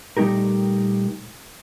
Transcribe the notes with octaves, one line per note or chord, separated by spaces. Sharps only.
A#2 G3 A3 D#4 G4 A#4